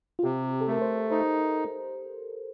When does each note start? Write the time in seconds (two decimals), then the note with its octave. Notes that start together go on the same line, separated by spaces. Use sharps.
0.19 F4
0.24 C3 G4
0.61 A4
0.68 A3 A#4
0.81 C5
1.11 D#4 C5